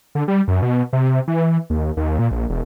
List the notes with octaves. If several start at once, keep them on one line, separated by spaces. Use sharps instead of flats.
D3
G3
F#2
B2
C3
E3
D#2
D#2
A#2
A#1
E1